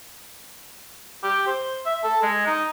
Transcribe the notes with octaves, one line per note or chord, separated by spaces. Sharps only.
G4
C5
E5
A4
G#3
D#4